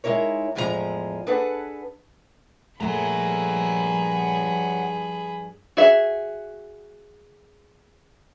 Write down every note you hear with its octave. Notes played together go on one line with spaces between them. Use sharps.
G#3 D#4 E4 A#4 C#5
E2 A2 F3 G#3 F#4 A#5
D4 G#4 A4 B4 F#5
G2 A#2 F3 A3 G#4 F#5 A#5 B5
F#4 G#4 E5